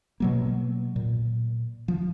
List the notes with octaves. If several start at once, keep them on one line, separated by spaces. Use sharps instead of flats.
B2 F#3 A#3
A#2
F3